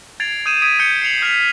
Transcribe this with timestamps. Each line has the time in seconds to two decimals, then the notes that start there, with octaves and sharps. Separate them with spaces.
0.20 G#6 A6 C7 D7 F7
0.46 D#6 G6 G#6 D#7 E7
0.62 D#6 G#6 B6 D7
0.80 G6 C#7 G7
1.02 C7 C#7 F7 F#7
1.22 D#6 F6 G6 B6 F7